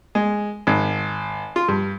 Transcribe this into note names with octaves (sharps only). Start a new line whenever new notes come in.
G#3
G#1
F4
G2